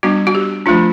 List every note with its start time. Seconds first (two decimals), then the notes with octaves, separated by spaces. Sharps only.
0.03 G3 B3 D4 F#4
0.27 F#4
0.35 G4
0.66 F3 A3 D4 F4